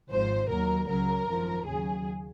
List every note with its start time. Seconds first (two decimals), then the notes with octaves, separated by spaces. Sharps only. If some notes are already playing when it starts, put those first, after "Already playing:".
0.10 G#1 G#2 F3 C5
0.49 D#2 D#3 F#3 A#4
0.88 C#2 C#3 F#3 A#4
1.27 G#1 F#2 F3
1.65 D#2 C#3 F#3 G#4